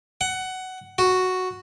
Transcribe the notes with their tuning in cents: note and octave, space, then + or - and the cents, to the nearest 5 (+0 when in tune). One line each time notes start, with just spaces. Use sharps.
F#5 +15
F#4 +0